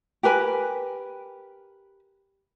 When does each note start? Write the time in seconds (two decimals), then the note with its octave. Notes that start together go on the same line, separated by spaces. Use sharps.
0.23 G4 A#4 B4 G#5